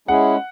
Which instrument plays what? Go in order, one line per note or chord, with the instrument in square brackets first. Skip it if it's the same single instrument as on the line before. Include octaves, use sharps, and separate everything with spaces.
[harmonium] G#3 C#4 E4 G#4 [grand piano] F#5